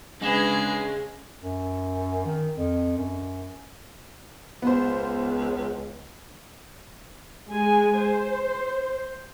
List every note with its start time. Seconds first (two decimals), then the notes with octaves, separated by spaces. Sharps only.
0.22 C#3 G#3 C#4 D4 G#4 B4 F#5 E7
1.42 F#2
2.26 D#3
2.56 F2
2.97 F#2
4.62 C#2 B3 C5
7.49 G#3 G#4 G#5
7.99 C5